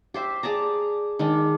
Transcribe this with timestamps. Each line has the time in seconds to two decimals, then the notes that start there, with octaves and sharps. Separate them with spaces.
0.14 G4 C5 E5
0.43 G#4 D5 A5 A#5
1.19 D#3 G#3 D4